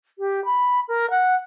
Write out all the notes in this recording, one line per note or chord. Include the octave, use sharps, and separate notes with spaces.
G4
B5
A#4
F#5